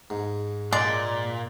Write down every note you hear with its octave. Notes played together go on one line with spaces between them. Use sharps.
G#2
A#2 G#3 D5